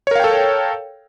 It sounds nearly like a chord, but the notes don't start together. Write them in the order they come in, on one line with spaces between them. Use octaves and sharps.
C#5 A#4 F5 G5 A4